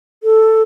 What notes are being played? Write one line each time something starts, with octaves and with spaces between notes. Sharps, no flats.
A4